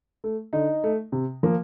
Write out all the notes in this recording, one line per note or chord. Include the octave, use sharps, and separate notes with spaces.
A3
D3 D#4
A3
C3
F3 A#3